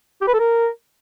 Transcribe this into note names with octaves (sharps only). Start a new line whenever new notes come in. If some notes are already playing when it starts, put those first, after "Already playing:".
G4
B4
A4
A#4